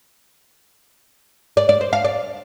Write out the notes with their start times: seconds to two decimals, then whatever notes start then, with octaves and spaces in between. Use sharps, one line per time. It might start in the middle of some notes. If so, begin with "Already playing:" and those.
1.57 D5
1.69 D5
1.81 C5
1.93 F5
2.05 D5